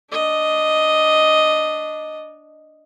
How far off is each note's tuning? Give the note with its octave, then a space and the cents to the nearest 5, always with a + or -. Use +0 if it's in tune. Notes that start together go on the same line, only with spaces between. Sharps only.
D4 +0 D#5 +0